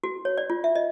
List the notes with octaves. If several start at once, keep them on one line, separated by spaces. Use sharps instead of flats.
F#4
C#5
D5
F4
E5
D#5